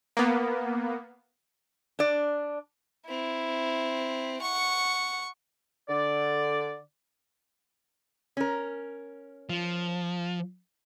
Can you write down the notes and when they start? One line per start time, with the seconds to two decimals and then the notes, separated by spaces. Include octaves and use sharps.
0.17 A#3 B3
1.99 D4 D5
3.08 C4 E4
4.42 F#5 C#6
5.89 D3 D5
8.37 C#4 A#4
9.49 F3